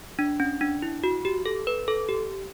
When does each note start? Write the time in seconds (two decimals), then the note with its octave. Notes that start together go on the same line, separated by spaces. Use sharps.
0.19 D4
0.40 C#4
0.61 D4
0.82 E4
1.04 F#4
1.25 G4
1.46 A4
1.67 B4
1.88 A4
2.09 G4